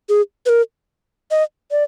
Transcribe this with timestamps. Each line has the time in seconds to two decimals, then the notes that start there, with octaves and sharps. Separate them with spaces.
0.09 G#4
0.46 B4
0.49 A#4
1.31 D#5
1.71 D5